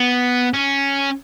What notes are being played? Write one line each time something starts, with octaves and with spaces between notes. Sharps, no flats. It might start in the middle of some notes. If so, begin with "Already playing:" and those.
Already playing: B3
C#4